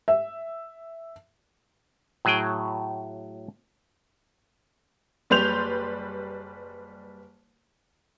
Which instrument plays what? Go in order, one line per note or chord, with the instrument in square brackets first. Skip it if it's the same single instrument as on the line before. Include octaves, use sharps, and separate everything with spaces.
[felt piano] E5
[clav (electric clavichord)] A2 F#3 G#4 G5
[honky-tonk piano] F#1 G3 B4 C6 G6 F7